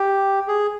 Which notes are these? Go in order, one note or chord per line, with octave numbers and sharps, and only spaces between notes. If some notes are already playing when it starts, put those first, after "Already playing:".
Already playing: G4
G#4